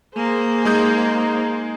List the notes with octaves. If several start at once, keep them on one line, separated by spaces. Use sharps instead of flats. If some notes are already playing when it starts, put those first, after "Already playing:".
A#3 G#4 C5
G#3 D#4 G#4 G6